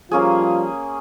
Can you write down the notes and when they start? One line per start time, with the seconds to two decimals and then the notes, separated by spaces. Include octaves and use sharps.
0.11 F3 G3 A#3 C#4 F4 G#4